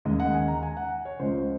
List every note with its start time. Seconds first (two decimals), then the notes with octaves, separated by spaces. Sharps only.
0.05 D#2 C#3 G#3 D#5
0.20 F#5
0.34 G#5
0.48 A#5
0.63 G#5
0.77 F#5
1.05 C#5
1.19 C#2 C#3 F3 G#3 C5
1.38 C5